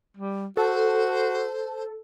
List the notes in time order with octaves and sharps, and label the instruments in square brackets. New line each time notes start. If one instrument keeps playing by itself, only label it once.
[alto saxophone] G3
[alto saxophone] F#4 [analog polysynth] A4 [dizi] C5